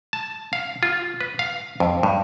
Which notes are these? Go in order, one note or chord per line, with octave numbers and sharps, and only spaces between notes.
A5
F5
F4
B4
F5
F2
G2